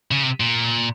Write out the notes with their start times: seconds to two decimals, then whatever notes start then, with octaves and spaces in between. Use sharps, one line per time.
0.11 C#3
0.23 C3
0.40 A#2